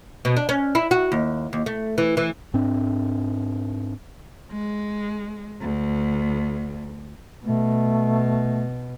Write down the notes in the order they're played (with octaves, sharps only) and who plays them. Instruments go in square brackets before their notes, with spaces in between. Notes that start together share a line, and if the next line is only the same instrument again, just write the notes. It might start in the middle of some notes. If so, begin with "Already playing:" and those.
[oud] B2
D4
C#4
E4
F#4
D#2
D#2
A3
E3
E3
[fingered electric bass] G#2 C4 D4
[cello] G#3
D2
[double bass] B2 [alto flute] A3